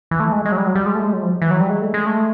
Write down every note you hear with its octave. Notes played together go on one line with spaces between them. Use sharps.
E3
A3
G#3
G#3
F#3
G3
F#3
G3
G#3
A3
G#3
F#3
F3
E3
F#3
G3
G#3
A3
G#3
A3